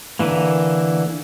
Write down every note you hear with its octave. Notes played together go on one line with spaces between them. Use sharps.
D3 E3 A#3